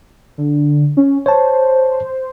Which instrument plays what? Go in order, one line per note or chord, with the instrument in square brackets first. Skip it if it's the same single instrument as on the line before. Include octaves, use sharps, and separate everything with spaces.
[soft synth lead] D3
C#4
[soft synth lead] C5 [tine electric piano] C#5 A5